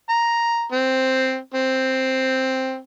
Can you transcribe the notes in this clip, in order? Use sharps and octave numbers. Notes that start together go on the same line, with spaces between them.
A#5
C4
C4